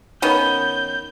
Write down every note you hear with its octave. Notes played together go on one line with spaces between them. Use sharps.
D#3 B3 C#4 G6